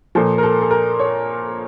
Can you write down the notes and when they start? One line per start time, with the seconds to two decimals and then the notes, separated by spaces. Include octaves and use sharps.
0.15 A#2 F3 A4
0.38 A#4
0.43 A4
0.62 A4
0.71 A#4
0.99 C#5